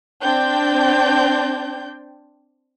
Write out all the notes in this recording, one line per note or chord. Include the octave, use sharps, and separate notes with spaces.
C4 D4 G5 G6